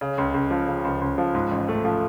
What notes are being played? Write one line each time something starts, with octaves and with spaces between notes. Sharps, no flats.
C#3
C#2
C#2
F3
C#3
C#2
C#2
F3
G#2
A1
A3
F3